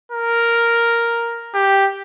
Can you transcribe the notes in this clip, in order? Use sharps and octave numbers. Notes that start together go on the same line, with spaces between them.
A#4
G4